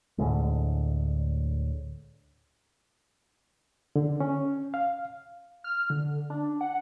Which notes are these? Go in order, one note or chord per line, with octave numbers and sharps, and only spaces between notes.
D2 A2 D3 G#3
D3
C#4
F5
F6
D3
D4
F#5